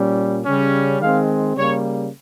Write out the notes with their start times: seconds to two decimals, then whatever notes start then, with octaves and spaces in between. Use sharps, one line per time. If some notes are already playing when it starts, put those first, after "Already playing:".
Already playing: A#2 G3 C#4
0.44 C#3 G3 C#4
1.01 D#3 G#3 C4 F5
1.56 C#3 G3 A#3 C#5